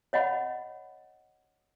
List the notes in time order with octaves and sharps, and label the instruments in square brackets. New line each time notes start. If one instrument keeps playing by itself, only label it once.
[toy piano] C#5 D#5 F#5 B5